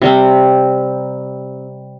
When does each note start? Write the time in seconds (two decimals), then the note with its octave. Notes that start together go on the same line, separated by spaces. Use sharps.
0.02 C3 G3 C4